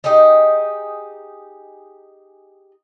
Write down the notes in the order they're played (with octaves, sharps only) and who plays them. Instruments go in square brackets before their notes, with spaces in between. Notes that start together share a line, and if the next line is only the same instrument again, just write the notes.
[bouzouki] D#4 G4 G#4 D#5